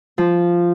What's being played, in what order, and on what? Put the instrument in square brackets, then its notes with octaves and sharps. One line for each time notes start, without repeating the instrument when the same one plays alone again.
[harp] F3